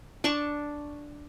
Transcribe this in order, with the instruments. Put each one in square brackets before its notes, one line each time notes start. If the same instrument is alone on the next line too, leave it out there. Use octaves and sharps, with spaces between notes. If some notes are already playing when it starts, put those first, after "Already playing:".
[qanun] D4 D5 A5 C#6